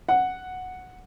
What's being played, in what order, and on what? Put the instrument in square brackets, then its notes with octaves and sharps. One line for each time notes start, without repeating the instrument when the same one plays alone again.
[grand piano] F#5